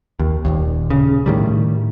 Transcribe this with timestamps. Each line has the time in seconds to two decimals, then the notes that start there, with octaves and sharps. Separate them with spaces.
0.19 D#2
0.45 D#1 G#1 D#2
0.90 C#3
1.26 A2 D#3 G3